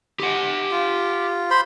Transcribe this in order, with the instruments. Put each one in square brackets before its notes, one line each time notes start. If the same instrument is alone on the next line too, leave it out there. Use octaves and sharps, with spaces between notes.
[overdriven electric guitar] G4 F#5
[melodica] F4
C5 B5 C6